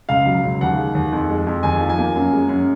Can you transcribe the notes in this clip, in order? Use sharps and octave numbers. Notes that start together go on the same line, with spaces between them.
C#2 F5
F#3
C#2
D#2 F#5
G#3
D#2
F2
G#3
F2
D#2 G#5
F3
G#5
A#3
F#2
G#3
F#2